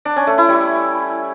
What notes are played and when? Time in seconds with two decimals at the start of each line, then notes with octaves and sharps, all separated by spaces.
0.05 D4
0.16 C#4
0.27 A3
0.38 E4
0.49 G3